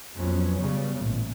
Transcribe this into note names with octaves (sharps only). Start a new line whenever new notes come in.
F2 F#3 B3 C#4
C#3 G3
A1 A#2